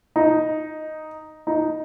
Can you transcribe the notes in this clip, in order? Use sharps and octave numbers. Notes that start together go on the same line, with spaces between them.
D#4
D#4